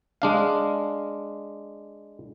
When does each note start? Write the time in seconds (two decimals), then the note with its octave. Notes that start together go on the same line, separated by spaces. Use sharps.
0.22 G#3 D4 F5